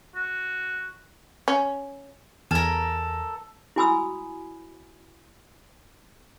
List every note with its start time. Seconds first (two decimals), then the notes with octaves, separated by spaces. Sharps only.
0.15 F#4
1.48 C#4
2.51 E2 A4 A#4 G#5 F6
3.76 E4 F#4 G#5 B5 D#6 E6